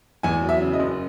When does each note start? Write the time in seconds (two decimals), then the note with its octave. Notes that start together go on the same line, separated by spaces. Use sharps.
0.23 E2 G#5
0.42 F#3
0.49 E5
0.61 C#3
0.73 D#5
0.79 F#1